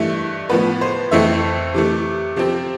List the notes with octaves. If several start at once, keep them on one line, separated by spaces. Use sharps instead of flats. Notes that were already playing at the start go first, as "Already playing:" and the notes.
Already playing: G2 E3 A3 E5
A2 F3 B3 B4
C5
F2 E3 A3 C4 E5
C3 E3 A3
C3 F3 C4